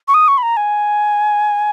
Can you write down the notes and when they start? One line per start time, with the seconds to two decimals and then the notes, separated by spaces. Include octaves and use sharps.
0.08 C#6
0.14 D#6
0.28 C#6
0.38 B5
0.43 A#5
0.57 G#5